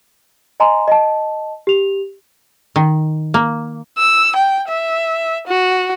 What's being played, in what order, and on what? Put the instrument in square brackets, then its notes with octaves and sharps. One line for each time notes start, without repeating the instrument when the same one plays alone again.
[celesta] D#5 G#5 A#5 C6
D#5 A5
G4 F7
[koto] D#3
A#3
[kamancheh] E6
G5
E5
F#4